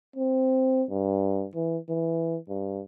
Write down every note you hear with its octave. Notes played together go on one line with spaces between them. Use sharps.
C4
G2
E3
E3
G2